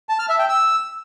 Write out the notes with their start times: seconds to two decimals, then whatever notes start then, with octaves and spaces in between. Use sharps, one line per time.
0.09 A5
0.19 F6
0.29 E5
0.39 G5
0.49 E6